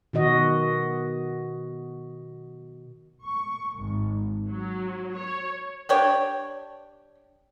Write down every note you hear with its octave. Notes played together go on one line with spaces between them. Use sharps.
B2 D#3 F#4 D#5
C#6
G#1
F#3
C#5
D4 G4 C#5